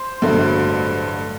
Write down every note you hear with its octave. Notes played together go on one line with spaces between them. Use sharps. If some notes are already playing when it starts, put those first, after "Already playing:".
Already playing: C5
A1 G2 D3 F#3 A3